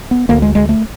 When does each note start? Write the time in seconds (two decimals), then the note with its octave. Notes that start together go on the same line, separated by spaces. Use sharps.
0.11 B3
0.29 D2 D3 A#3
0.42 G#3
0.55 G#3
0.69 A3